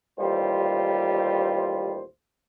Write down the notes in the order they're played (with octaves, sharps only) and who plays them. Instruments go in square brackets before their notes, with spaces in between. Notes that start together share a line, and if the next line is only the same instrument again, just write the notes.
[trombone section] A1 D#2 G3 F4 C5